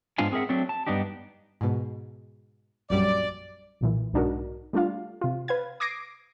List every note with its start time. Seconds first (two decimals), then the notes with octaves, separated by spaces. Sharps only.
0.18 G#2 B3 D4 F4 F5 G#5
0.32 C4 G#4 A#4 E5 F#5
0.49 F#3 A3 C4 D4
0.69 A5
0.87 G2 B3 D4 D#4 G4
1.61 G#2 B2
2.90 A#1 F#2 G3 D5
3.81 B1 A#2 E3
4.13 B1 G#2 D4 D#4 F#4 A#4
4.73 G3 A3 D4 F4 F5
5.21 C3 F4
5.48 B4 F5 G#6
5.80 D6 D#6 G#6 A#6 C7 D7